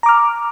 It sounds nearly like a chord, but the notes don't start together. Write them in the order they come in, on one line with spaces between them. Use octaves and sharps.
A#5 D6 F6